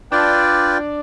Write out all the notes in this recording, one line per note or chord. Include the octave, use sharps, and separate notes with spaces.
D4 F4 B4 D5 G5